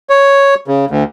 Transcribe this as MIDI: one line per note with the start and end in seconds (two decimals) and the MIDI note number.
0.10 0.54 73
0.68 0.85 49
0.90 1.03 38